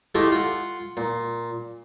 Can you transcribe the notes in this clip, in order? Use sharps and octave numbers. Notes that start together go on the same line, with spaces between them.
A3 E4 F4 G4 A4 D#5
F4 F#5
A#2